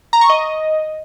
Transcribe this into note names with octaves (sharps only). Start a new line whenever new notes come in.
A#5
C#6
D#5